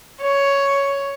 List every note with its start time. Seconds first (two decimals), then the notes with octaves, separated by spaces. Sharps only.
0.22 C#5